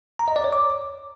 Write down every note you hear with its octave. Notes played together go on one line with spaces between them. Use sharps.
A#5
D#5
D5
C#5
D6